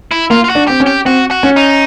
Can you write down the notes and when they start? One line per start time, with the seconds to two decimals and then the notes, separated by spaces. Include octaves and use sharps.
0.11 E4
0.30 A#3 F4
0.44 F4
0.49 F#4
0.55 D4
0.67 C4 G4
0.80 C#4
0.86 G4
1.05 C4 F#4
1.31 F#4
1.43 C#4
1.56 D#4